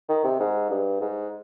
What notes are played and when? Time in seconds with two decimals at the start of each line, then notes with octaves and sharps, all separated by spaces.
0.09 D#3
0.24 C3
0.40 G#2
0.70 G2
1.00 G#2